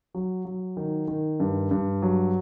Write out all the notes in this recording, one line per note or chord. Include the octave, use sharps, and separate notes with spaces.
F#3
F#3
D#3
D#3
G2
G2
F#3